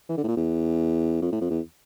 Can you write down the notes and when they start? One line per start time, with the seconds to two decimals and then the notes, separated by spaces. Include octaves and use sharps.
0.09 E3
0.18 D3
0.23 A2
0.28 A#2
0.37 E2
1.22 F2
1.32 A2
1.41 F2
1.50 E2